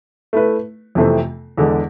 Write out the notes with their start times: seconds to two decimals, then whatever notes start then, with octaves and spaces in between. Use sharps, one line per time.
0.33 A3 E4 B4
0.95 F2 C3 E3 A3 C4
1.58 E2 D3 G#3